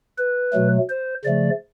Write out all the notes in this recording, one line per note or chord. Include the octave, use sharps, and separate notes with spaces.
B4
B2 F#3 A3
C5
C#3 F3 A3 D5